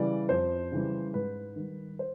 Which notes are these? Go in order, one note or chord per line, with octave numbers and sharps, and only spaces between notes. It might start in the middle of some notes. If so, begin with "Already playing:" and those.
Already playing: C#3 E3 G3 D5
F2 C5
C#3 E3 G3
G#2 B4
D#3 G3
C5